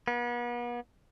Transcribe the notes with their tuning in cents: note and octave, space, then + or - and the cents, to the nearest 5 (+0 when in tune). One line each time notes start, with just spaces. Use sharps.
B3 -40